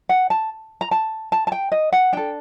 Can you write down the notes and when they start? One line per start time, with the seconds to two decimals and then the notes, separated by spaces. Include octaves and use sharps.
0.09 F#5
0.30 A5
0.81 A#5
0.91 A5
1.32 A5
1.47 A5
1.52 G5
1.72 D#5
1.93 F#5
2.13 D4 A4 G5